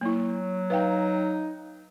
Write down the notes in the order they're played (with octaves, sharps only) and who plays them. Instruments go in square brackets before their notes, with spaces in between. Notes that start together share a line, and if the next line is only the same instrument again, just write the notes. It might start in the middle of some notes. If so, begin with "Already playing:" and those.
[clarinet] F#3 [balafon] A#3 E4
[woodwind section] D#4 [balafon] B4 F5 G5